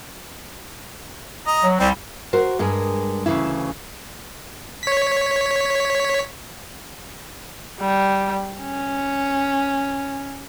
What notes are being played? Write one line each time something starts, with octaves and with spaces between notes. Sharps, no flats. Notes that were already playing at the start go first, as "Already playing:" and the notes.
D#5 A#5
F#3
C2 G3 C4
F#4 A#4 C5
G2 G#3 G#4 A#4
D2 G#2 C#3 E3 E4
C#5 B6
G3
C#4